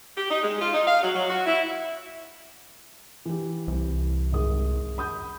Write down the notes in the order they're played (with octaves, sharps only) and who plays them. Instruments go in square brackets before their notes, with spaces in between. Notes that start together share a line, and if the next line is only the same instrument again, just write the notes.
[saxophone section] G4
D#4
G#3
F4
D#4
F5
F#3
F#3
F#4
E4
[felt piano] E3 G4
[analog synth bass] C2
[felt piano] G#1 G#4 D#6
B5 D#6 G6